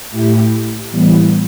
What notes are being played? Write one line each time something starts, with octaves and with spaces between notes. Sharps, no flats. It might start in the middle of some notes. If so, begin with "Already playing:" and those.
A2 A3 E4 G4
A2 E3 G3 B3